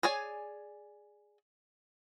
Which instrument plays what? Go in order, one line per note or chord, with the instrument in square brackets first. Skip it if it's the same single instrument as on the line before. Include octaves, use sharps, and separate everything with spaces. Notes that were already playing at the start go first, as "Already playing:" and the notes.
[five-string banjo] G#4 C#5 D5 G#5